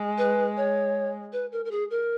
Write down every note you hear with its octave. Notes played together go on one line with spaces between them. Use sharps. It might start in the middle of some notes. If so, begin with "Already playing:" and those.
Already playing: G#3
B4
C#5
B4
A#4
A#4
G#4
A#4